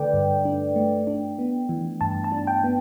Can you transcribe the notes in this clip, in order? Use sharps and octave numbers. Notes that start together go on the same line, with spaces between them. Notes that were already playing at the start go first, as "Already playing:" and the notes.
Already playing: D3 A3 D4 A4 B4 D5 G5
G2
D4
A3
D4
B3
E3
G2 A5
A5
D4
G5
B3